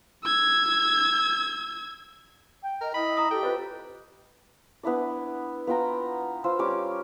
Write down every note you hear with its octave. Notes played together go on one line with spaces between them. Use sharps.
E6 G#6
G5
A#4 D#5
E4 D#5 B5
A#5 D#6
G4 A4 G5
F4 B4 C5 D#5
B3 D4 E4 D5
B3 F4 G5 A#5
F4 C5 E6
G3 C#4 D6